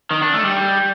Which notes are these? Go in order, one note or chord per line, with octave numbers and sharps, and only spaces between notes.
D#3
D4
A3
G3